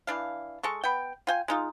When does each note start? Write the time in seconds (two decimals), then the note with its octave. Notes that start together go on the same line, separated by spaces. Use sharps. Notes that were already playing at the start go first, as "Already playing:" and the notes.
0.07 E3 D4 F5
0.63 G#3 A4 C#6
0.84 B3 G5
1.27 F4 G5 G#5
1.48 G#3 D#4 F4